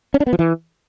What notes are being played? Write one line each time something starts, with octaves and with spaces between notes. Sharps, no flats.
C#4
D4
B3
F3
E3